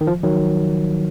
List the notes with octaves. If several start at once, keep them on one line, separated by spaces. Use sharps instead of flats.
D#3
F3
D#3 F#3